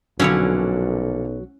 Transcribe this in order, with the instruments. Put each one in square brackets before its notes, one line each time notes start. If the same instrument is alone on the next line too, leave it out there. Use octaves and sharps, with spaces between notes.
[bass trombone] B1 [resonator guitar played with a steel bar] A#2 D3 F3 [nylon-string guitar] F#3 [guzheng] C#4 E4 C#5